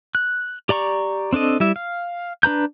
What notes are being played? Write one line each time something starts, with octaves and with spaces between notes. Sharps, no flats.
F#6
G4 D5 A#5 C#6
C4 D4 A4 D#5
G3 E4 E5
F5
D4 B4 A#5 G6